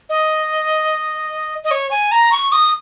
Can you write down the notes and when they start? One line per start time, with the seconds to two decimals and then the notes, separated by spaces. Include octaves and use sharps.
0.09 D#5
1.64 D#5
1.71 C#5
1.91 G#5
2.12 A#5
2.32 C#6
2.52 D#6